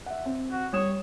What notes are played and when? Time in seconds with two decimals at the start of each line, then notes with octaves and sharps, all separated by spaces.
0.06 E5 F#5
0.25 C4
0.52 F#4
0.73 G3 C#5 D#6 E7